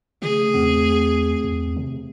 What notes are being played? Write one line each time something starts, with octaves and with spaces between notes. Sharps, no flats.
C#3 A3 G#4
E2 C4
E2
C3